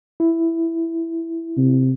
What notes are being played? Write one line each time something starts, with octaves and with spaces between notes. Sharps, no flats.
E4
C3